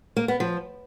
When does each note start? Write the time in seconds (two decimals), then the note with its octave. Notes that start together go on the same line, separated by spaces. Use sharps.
0.16 A#3
0.28 B3
0.40 F3